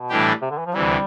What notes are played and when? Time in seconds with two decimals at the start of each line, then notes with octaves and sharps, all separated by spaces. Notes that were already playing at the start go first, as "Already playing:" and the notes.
Already playing: B2
0.09 A2 E3 G3 D4 G4
0.42 C3
0.51 D3
0.58 E3
0.66 F3
0.74 D2 C3 E3 G3